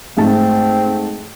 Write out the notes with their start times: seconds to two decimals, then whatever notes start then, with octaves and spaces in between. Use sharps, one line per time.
0.17 G#2 A3 C4 A5